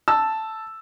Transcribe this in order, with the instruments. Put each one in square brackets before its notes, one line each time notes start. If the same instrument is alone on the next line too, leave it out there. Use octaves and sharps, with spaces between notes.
[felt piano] A5 E6